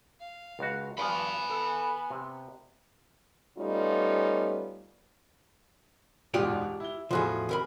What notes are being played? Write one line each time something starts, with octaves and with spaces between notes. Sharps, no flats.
F5
C#2 F#4
G2 F3 B3 G#5 B5
A4
C3
G3 A3 B3 C#4 D#4 F4
E1 G#2 B2 F4 G4 D5
E4 G7
E2 A2 F3 F4 F#4 G#4
D#2 A#4 B5